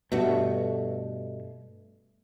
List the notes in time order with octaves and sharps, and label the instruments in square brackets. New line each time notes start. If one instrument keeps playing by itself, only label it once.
[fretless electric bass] G2 B2 [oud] A3 F#4